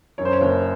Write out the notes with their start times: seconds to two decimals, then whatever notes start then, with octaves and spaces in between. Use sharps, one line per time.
0.18 F#2 C#5
0.25 C5
0.33 C#5
0.41 F#1